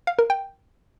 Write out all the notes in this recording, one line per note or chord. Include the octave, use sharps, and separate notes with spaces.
F5
A#4
G5